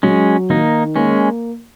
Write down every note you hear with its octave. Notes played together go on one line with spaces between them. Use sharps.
F#3 G#3 C#4
D#3 A#3 D#4
G#3 A#3 C#4